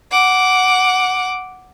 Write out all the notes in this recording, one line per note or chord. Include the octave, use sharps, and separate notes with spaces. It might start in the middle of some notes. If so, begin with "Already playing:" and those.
F#5 D6